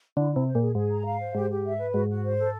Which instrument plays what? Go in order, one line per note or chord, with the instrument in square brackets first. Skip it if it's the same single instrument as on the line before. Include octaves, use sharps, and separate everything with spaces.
[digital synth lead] D3 [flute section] E4
[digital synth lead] C3 [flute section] E4
[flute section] C5
[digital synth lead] A#2
[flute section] G#4
[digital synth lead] G#2 [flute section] G#4
[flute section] A#5
F5
C5
[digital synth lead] G#2 [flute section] G4
[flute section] G4
E5
B4
[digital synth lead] G#2 [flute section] F#4
[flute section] F#4
C5
A4